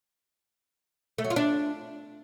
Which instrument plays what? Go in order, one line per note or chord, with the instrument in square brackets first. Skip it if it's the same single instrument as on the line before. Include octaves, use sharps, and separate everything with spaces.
[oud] A3
F#3
F4
D4